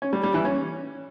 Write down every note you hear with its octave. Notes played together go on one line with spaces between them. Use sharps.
C#4
G3
G3
E3
C#4